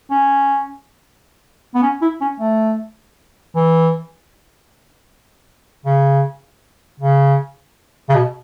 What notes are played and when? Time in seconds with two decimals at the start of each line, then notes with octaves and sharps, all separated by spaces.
0.11 C#4
1.75 B3
1.83 C#4
2.02 E4
2.21 C#4
2.40 A3
3.56 E3
5.86 C#3
7.00 C#3
8.10 C#3
8.15 B2